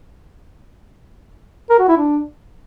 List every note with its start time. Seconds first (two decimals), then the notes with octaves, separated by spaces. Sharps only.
1.70 A#4
1.79 F#4
1.88 E4
1.98 D4